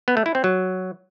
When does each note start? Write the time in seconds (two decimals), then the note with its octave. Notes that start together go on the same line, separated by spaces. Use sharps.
0.08 B3
0.17 A3
0.26 E4
0.35 C4
0.44 F#3